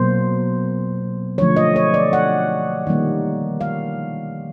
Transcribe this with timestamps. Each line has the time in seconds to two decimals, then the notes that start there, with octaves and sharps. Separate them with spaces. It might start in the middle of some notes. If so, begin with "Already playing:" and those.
Already playing: B2 F#3 A#3 C5
1.38 D3 F3 A3 C#5
1.56 D#5
1.76 C#5
1.94 D5
2.13 F#5
2.87 D#3 G3 A#3
3.61 F5